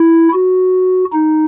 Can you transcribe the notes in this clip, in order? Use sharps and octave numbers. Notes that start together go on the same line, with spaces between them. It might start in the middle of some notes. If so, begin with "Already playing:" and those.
Already playing: E4
F#4
D#4